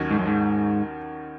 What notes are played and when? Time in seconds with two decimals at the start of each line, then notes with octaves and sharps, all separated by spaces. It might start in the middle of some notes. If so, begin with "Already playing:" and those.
Already playing: D#2 D#3 F#3 C#4
0.11 G#2
0.19 F#2
0.27 G#2